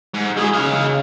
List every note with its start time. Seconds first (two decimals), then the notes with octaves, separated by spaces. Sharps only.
0.14 G#2
0.37 F#3 E4 G#4
0.53 C#3 D#4 F5